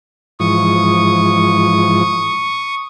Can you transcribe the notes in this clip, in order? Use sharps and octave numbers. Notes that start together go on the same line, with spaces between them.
G#2 E3 F3 C#6 D#6